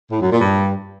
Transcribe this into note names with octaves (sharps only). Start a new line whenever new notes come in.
A2
F#2
A#2
G2